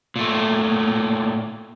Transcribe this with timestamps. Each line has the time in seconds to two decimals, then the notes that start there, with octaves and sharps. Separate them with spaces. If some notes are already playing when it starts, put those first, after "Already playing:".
0.16 A#2 A3